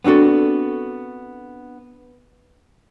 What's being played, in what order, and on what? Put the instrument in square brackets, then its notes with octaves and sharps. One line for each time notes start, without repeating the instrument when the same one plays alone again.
[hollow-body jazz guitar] B3 C4 D4 F#4 A4